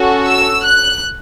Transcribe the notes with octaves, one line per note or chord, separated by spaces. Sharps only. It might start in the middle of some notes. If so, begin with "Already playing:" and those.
Already playing: C#4 F#4 A4
E6
F#6